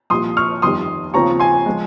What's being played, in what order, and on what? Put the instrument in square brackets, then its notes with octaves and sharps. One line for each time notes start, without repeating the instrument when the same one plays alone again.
[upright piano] C2 A#2 F3 C6 D#6
C#6 F6
G1 F2 D#3 G3 C6 D#6
D#2 C#3 F3 C4 F4 A#5 C#6
G#5 C6
F3 G#3